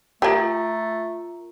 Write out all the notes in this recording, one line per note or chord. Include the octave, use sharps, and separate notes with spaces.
A3 F4 G4 A#4 G#5 A#5